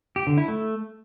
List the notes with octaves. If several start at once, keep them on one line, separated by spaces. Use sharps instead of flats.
G4
D3
E4
A3